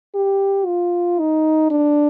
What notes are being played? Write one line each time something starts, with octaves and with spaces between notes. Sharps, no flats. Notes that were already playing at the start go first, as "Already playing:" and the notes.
G4
F4
D#4
D4